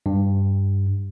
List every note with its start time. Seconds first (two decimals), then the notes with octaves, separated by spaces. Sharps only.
0.06 G2